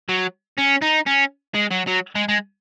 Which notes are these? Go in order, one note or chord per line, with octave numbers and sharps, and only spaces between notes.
F#3
C#4
D#4
C#4
G#3
F#3
F#3
G#3
G#3